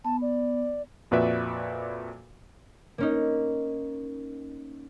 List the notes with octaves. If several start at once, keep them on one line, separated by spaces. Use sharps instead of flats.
B3 A5
D5
F2 A#2 F#4 B4 D5 E5
A#3 C#4 D#4